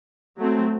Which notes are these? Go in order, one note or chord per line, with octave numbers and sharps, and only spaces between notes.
F#3 A3 C4